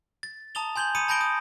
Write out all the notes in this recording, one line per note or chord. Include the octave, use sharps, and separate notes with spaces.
A6
A5 A#5 D#6 A6 F7 G7
G#5 C6 G6 G#6 F#7 G7
A#5 B5 D#6 G#6 C#7 D#7
A5 B5 G6 A#6 D7 G7
D#6